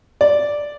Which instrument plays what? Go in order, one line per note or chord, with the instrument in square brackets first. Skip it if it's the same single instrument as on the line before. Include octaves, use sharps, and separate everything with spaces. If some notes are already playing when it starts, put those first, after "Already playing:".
[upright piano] D5